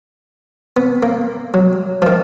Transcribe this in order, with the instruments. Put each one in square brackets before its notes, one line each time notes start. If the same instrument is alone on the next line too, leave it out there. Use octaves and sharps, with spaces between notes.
[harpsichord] B3
A#3
F#3
F3
D#3